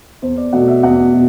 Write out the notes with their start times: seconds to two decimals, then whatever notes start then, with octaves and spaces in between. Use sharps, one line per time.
0.22 E2 C5
0.37 D5
0.53 B2 A3 F#5
0.68 E5
0.83 E2 F#5
1.13 B2